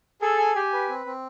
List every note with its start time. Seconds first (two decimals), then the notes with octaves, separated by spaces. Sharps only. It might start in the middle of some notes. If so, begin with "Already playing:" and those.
0.22 G#4 A4
0.39 G#5
0.55 G4 G#5
0.73 B4
0.89 C4
1.06 C4